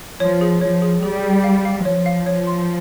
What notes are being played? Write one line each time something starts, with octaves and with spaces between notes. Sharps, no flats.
F3 C#5
G#4
F3 C#5
G#4
G3 G#4
G#4
F5
F5
F3 C#5
F5
C#5
C6